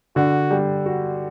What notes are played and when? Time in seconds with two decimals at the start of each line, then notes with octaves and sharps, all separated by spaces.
0.16 D3 F#4
0.51 G3
0.86 F#4